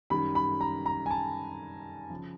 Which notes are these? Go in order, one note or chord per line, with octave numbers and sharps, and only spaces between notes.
F#2 D#3 G3 B5
B5
A#5
A#5
G#5
A5
C#3 F3